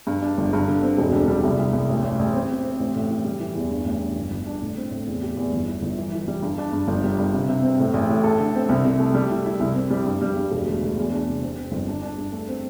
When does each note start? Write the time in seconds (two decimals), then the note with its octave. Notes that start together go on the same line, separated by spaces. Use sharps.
0.07 G2
0.22 D4
0.38 G1
0.53 G2
0.68 D3
0.83 C4
0.98 E1
1.13 D3
1.28 G3
1.43 C2
1.59 C2
1.73 C2
1.89 A1
2.04 A1
2.19 A1
2.34 C4
2.50 C4
2.65 C4
2.80 A1
2.95 A2
3.10 E3
3.25 G3
3.40 E3
3.55 E2
3.70 G2
3.85 A1
4.01 G2
4.16 G1
4.31 G1
4.46 D4
4.62 A2
4.77 C4
4.91 A2
5.07 E2
5.22 G4
5.37 E2
5.53 G1
5.68 E4
5.82 G1
5.98 E3
6.13 E3
6.28 G3
6.42 G2
6.58 D4
6.73 G2
6.88 G1
7.04 G3
7.19 G2
7.33 C3
7.48 C3
7.63 C4
7.79 A2
7.94 A1
8.09 A2
8.24 A4
8.39 D3
8.55 C4
8.69 C2
8.84 C3
8.99 A3
9.15 G3
9.31 E4
9.46 E4
9.60 C2
9.75 C4
9.91 G3
10.06 G2
10.22 G3
10.36 G2
10.52 E1
10.66 D2
10.82 D2
10.97 E2
11.12 D4
11.27 C3
11.43 C4
11.58 C4
11.72 G1
11.88 D4
12.02 D4
12.18 G2
12.32 A3
12.49 C4